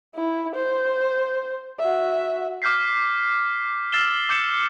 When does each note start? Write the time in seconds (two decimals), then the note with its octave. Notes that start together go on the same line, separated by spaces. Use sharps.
0.15 E4
0.55 C5
1.79 F#4 E5
2.62 D6 F6 G6 B6 C7
3.92 E6 F6 A6 C7 E7 G7
4.29 D6 G6 C#7 E7